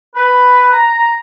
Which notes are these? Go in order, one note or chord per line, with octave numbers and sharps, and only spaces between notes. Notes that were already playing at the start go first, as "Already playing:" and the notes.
B4
A#5